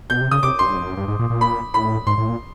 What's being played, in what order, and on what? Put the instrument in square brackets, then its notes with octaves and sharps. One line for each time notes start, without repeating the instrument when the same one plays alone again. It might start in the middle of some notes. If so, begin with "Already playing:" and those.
[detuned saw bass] B2 [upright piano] G6
[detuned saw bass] C3
[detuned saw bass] C#3 [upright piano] D#6
[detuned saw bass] C3 [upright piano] D6
[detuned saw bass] F#2 [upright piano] C6
[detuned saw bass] G2
F2
F#2
G2
G#2
A#2
A#2
[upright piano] B5
[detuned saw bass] A2 [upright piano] B5
[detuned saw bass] G#2 [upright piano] C6
[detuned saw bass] A2
A#2